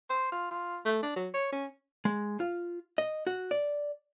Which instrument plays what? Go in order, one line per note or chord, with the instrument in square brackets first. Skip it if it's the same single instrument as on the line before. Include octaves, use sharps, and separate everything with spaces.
[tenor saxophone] C5
F4
F4
A3
D4
F#3
C#5
C#4
[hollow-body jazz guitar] G#3
F4
D#5
F#4
D5